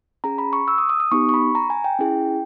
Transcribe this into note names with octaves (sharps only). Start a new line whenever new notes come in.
C#4 G#4 A#5
B5
C#6
E6
D#6
D#6
D#6
B3 D#4 G4 C#6
C#6
B5
A#5
G#5
G5
C#4 E4 G#4